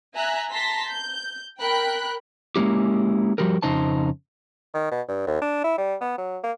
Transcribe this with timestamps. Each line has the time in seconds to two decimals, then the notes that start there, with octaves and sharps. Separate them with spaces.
0.14 E5 G#5 A#5 F#6
0.51 A5 A#5 C6 A#6 B6
0.86 G6
1.60 A#4 G5 B5 F#6
2.56 G#3 A#3 C#4 E4 G4
3.38 F3 G3 F#4 G4 A#4
3.62 F2 C#3 D#4 C5 A5
4.74 D#3
4.91 B2
5.08 G2
5.27 D#2
5.42 D4
5.64 E4
5.78 G3
6.01 B3
6.18 F#3
6.43 A#3